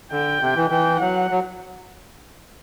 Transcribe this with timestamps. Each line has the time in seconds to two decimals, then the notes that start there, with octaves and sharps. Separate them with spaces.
0.12 D3 G5
0.41 C3
0.55 E3
0.70 E3 G5
1.00 F#3 F#5
1.31 F#3